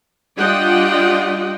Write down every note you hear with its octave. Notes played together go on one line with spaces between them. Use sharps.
G3 D4 F4 D#5 F#5 G5